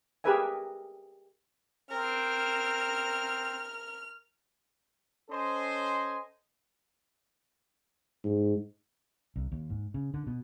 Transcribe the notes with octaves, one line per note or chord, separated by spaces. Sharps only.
G4 G#4 A#4 B4 E5 G#5
C4 A#4 F6
C#4 A4 C5 D#5 G#5 C6
G#2
C2
D#2
G#2
C#3
D3
B2